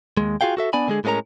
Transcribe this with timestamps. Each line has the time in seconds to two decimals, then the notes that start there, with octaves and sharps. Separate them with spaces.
0.17 D#2 G#3
0.41 F4 F#4 G#4 F5 G5
0.57 F#4 A4 E5
0.73 B3 D4 D5 G#5 B5
0.88 D3 G#3 G#4
1.04 A2 G#3 A3 C#4 A#4 A#5